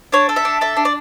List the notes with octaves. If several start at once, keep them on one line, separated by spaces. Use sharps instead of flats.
D4 C#5
A4
E5
D4
A4 E5
D4
D5